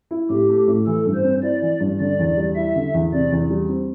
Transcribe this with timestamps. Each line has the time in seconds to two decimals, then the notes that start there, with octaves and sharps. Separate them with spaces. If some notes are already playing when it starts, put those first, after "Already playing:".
0.11 E4
0.30 A2 G4
0.49 A3
0.68 A2
0.87 E3 A4
1.06 G2
1.14 C5
1.24 C4
1.43 E4 D5
1.62 E3
1.80 G2
2.00 D3 D5
2.19 E2
2.37 G3
2.56 E4 E5
2.76 D3
2.94 E2
3.13 C3 D5
3.32 E2
3.50 G3
3.69 C4